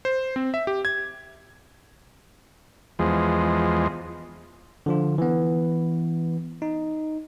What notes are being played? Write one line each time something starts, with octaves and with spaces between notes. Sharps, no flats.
C5
C4
E5
G4
G#6
E2 F3 G#3
D3 F3 F4
E3 B3
D#4